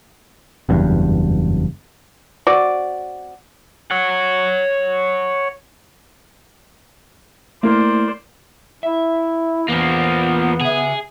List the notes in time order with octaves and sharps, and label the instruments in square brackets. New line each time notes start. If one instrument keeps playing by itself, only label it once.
[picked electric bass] F#1 E2 G2
[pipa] C4 F#4 D5
[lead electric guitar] C#5 F#5
[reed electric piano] A3 E4 [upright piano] A#3 [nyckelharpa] C5 D5
[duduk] E4 [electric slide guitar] E5
[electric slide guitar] E2 [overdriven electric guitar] F3 A#3 [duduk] B3
[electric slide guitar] C#3 E5 [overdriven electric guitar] G#4